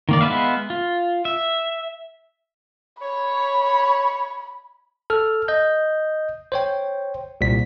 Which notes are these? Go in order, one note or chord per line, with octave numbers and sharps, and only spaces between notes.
D#3 A#3 D5
G#3 B3 B4 E5 F5
F4
E5
C#5 B5
A4 F6
D#5 G6
C5 C#5 G5
C2 A#2 B6